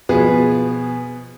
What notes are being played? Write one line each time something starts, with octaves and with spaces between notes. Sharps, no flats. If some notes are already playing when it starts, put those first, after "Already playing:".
B2 F3 G#4 B4